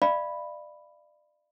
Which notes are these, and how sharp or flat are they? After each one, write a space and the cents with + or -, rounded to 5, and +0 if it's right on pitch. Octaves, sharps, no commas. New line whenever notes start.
D5 +30 F5 -35 B5 +0